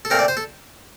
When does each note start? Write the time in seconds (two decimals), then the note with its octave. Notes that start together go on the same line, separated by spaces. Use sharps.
0.05 A4
0.10 A#2 A3 C4 A#4
0.19 D5
0.28 C5
0.37 A4